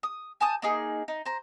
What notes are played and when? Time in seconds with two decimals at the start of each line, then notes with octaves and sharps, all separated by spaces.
0.03 D#6
0.41 G#5 A5 D#6 G6
0.62 A#3 D#4 G#4
1.08 D#4
1.25 C5 A#5